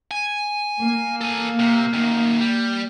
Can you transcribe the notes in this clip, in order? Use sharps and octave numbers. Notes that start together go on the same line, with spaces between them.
G#5
A#3
A4 G#5
C3
F#2 D#3
G3